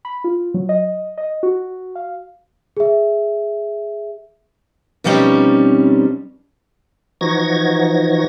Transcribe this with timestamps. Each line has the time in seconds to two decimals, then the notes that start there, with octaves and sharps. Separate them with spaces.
0.05 B5
0.24 F4
0.54 F#3
0.69 D#5
1.18 D#5
1.43 F#4
1.95 F5
2.77 G#4 E5
5.04 B2 F3 G3 C4 C#4 D#4
7.21 E3 F3 D#4 F#4 G#6 A#6